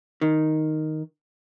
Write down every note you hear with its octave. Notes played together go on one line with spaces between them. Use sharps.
D#3